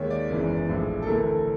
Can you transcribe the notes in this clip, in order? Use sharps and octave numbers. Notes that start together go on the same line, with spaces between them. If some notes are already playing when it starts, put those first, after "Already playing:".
Already playing: D#2 D#3 G#3 C#5
D5
F#1 E2 C#3 E3 G#3
A#1 A2 F3 G#3
A4
D2 C3 E3 A3 A#4
A4